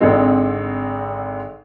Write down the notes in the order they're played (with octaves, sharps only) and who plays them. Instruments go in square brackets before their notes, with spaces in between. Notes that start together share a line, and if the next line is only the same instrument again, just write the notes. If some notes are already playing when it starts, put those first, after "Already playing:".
[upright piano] G#1 D3 G#3 C4